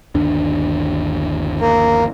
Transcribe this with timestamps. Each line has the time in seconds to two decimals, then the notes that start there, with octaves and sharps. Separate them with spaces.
0.15 G1 D#2 D4
1.61 A#3